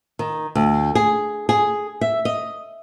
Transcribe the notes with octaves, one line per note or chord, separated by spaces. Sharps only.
D#3
D2
G#4
G#4
E5
D#5